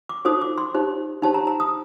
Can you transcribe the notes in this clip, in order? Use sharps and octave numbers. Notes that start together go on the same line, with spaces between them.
D6
D#4 F#4 A4 C5 D#6
D6
C6
D#4 G4 C5
D#4 G4 C5 A5
A#5
A#5
D#6